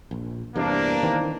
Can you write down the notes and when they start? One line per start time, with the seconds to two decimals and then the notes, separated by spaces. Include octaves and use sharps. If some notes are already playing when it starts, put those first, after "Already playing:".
0.11 A#1
0.56 E2 G2 C3 A#3 D4
1.03 D#3 E3 C4